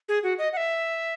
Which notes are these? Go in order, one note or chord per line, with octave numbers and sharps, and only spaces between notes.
G#4
F#4
D#5
F#5
E5